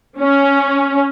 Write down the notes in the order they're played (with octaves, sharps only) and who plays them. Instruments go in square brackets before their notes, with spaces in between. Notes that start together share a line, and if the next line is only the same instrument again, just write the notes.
[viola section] C#4